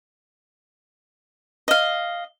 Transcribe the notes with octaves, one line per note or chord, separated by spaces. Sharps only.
D#5 F5